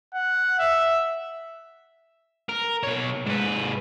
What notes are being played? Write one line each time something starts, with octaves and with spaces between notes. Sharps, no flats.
F#5
E5
A#4
B2 C#5
G#2 B4